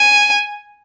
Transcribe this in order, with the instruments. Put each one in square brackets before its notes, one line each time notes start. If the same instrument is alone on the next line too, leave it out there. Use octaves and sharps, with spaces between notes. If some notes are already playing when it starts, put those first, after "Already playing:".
Already playing: [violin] G#5